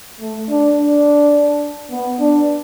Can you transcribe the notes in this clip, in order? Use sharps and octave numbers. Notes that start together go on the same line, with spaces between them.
A3
D4
D4
B3
D4